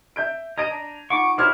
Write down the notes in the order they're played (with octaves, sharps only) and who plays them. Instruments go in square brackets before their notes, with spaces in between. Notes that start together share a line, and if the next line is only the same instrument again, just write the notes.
[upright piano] E5 G6 D7
[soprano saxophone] D#5 [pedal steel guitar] A#5 [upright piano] G#6 D7 D#7
[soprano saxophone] D4
[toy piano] D#4 F4 F#5 [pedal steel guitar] C#6 [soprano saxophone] D6
[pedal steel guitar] E4 [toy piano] F#4 G4 C#5 [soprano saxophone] C5 [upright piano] D6 F6 G#6